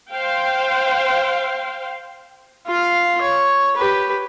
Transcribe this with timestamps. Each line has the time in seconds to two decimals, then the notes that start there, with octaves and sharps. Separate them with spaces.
0.11 C5 F5 G5
2.67 F4 F5
3.21 C#5
3.76 G4 B4